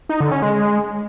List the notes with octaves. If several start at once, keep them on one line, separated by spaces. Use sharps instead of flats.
D#4
D3
C#4
G#3